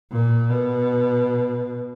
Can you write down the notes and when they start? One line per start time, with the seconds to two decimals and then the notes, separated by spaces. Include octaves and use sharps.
0.12 A#2
0.50 B2